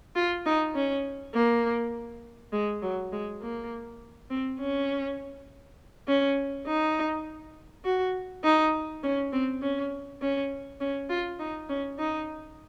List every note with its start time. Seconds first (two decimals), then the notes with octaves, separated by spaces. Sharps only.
0.16 F4
0.46 D#4
0.75 C#4
1.34 A#3
2.53 G#3
2.82 F#3
3.12 G#3
3.41 A#3
4.30 C4
4.60 C#4
6.08 C#4
6.67 D#4
7.85 F#4
8.44 D#4
9.03 C#4
9.33 C4
9.62 C#4
10.22 C#4
10.81 C#4
11.10 F4
11.40 D#4
11.69 C#4
11.99 D#4